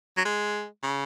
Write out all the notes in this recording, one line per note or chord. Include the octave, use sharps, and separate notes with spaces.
F#3
G#3
C#3